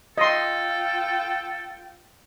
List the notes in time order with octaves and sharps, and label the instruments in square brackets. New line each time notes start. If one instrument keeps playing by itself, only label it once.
[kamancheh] F4 G5 [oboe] A4 [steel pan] D#5 C6